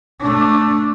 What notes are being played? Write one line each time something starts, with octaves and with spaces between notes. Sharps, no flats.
A3 D4